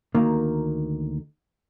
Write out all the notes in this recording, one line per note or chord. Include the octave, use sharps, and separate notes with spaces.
D2 D#3 A#3